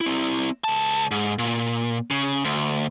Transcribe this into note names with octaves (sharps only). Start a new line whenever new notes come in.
C4 E4
C#2 A5
G#2
A#2
C#3
D2